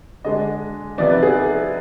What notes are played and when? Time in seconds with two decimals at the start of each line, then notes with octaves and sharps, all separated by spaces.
0.24 D3 G#3 D4 D#5
0.98 C3 F3 B3 D#4 D5
1.10 B4
1.23 G#4